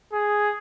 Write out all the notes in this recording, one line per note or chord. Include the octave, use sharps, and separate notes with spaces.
G#4